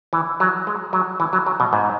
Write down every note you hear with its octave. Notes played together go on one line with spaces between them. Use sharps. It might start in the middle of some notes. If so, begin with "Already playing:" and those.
E3
F#3
G#3
F#3
E3
F#3
F#3
B2
G#2